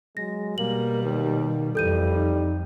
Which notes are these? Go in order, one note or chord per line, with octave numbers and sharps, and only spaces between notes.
F#3 G#3 A#6
B2 G3 A#3 F#7
D#2 D#3
F2 E3 G3 A4 G6 D#7
D#4